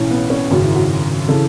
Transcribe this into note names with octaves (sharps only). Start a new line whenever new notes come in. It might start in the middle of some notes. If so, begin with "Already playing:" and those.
Already playing: B1 A2 E3 C#4
B3
C#4
G#1 F#2 C#3 F#3
E4
F#4
C#3 E3 A4